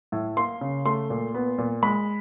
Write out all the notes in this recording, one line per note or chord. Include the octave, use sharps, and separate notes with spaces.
A2
A#3 C6
C#3
A3 C6
A#2
B3
A#2
G#3 B5